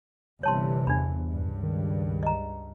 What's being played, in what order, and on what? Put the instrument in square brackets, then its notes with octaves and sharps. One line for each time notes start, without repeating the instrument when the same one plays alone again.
[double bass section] G1 C3 E3 [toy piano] C#5 A5 C6
[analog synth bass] E2 [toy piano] D4 B5
[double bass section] C#2 G2
[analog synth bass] D#3
[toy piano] D#5 A#5